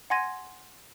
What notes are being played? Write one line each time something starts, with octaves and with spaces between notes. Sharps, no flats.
F#5 G#5 C6 G#6 A#6 D#7